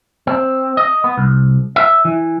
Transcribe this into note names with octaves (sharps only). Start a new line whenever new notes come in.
C4
D#5
B3
C2
E5
E3